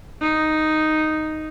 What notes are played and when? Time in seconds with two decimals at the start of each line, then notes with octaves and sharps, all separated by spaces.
0.21 D#4